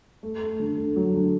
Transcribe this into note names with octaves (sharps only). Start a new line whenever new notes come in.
A3
A3
D3
D3
F#3
D3